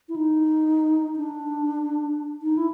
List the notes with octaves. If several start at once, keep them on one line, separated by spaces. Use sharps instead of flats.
E4
D#4
D4
D#4
E4